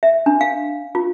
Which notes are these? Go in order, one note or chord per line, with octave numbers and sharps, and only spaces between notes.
E5
D4
F5
F4